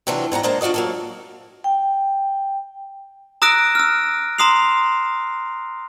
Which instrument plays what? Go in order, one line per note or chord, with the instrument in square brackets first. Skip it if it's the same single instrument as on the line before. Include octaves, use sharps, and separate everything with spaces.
[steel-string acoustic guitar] C3 E3 F#3 D4 F4
G#2 G3 F#5 A#5
G#3 A#3 D4 C5 A5 A#5
D4 F4 F#4 D5 D#5
F#3 A#3 A4
[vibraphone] G5
[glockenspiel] A#5 D#6 E6 F#6 A#6 D7
E6 F6
A#5 C6 D#6 C7 F7